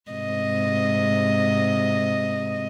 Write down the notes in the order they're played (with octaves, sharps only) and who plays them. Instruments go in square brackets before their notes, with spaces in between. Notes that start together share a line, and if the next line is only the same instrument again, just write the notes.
[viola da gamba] G#2 C3 D#5